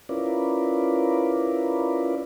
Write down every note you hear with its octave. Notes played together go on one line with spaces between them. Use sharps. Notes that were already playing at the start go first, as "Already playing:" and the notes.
C#4 E4 F4 A#4 B4 D5